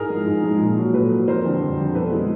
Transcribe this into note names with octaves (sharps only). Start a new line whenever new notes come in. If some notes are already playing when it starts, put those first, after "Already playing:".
Already playing: G#2 G#4 A#4
F3 G#3
G#2
F3 G#3
A#2
F#3
A#2 A4 B4
F#3
F2 A#4 C5
D3 G3
F2
D3 G3
B2 A4 B4
G#3